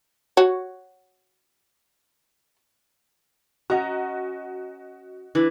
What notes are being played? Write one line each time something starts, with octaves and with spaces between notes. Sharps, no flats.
F#4 C#5
C#4 F#4 D#5 A#5
E3 D4